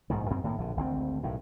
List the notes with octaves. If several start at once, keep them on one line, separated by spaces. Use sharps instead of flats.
A#1 G#2 B2 D#3
F#2 C4
A2 D#3 A#3
A#1 D3
G#1 D2 C4
B1 A2 D#3